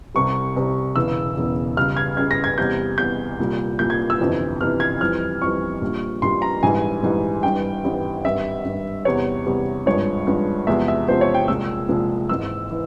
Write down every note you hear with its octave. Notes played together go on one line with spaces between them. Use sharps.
C2 C3 G3 C#6
C2 C3 G3
E1 E2 C#3 E3 E6
E1 E2 C#3 E3
C#2 C#3 G3 F6
G#6
C#2 C#3 G3 G#6
A#6
G#6
E2 C3 G3 G6
E2 C3 G3 G6
C2 A#2 G3
C2 A#2 G3 G6
G#6
E6
G1 F2 C3 E3
G1 F2 C3 E3 F6
G#6
F2 E3 G3 F6
F2 E3 G3 C#6
A#1 A#2 G3
A#1 A#2 G3 C6
A#5
A#1 G#2 E3 G3 G#5
A#1 G#2 E3 G3
G#1 G2 E3 G3 G5
G#1 G2 E3 G3
G#1 G2 G3 E5
G#1 G2 G3
E2 C3 G3 C#5
E2 C3 G3
G#1 G2 F3 G#3 C#5
G#1 G2 F3 G#3
E2 C3 F3 G#3 E5
E5
E2 C3 F3 G#3 C5
C#5
G5
C2 A#2 F3 G#3 E6
C2 A#2 F3 G#3
G#1 G#2 E3 E6
E3